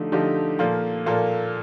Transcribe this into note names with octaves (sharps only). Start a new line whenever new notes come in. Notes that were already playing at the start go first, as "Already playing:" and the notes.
Already playing: D3 F3 A3 D#4 G4
D3 F3 A3 D#4 G4
A#2 F3 A#3 F4 A4
A#2 F3 A#3 F4 A4